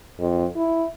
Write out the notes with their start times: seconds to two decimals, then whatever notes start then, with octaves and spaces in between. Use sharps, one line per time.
0.20 F2
0.56 E4